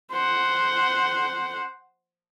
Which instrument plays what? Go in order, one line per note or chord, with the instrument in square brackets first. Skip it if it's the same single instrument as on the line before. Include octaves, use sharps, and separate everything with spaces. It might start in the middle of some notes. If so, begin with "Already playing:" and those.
[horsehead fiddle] C5 F#5